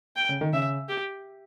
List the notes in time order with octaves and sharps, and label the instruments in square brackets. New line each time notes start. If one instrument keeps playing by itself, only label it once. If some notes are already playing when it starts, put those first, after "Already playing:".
[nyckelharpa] G5
[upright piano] C#3
D#3
[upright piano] C#3 [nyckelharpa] E5
[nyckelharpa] G4